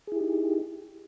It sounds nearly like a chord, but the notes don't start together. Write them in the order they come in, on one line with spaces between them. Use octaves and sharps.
G#4 E4 G4 D#4